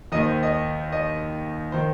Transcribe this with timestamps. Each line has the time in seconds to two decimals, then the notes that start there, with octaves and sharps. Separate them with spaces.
0.12 D#2 D#3 D#5
0.23 C5
0.43 D#5
0.92 D#5
1.72 D#3 C5